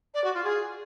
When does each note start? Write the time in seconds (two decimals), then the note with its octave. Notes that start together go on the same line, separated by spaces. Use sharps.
0.14 D5
0.24 F#4
0.34 F4
0.44 G#4